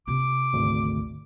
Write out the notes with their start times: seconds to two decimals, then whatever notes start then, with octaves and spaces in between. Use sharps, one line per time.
0.07 C3 F4 D6
0.53 G#1 D2